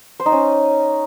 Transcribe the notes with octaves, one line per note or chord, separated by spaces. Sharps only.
C5
D#4
C#4